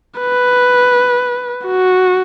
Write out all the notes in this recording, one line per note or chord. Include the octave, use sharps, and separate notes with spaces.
B4
F#4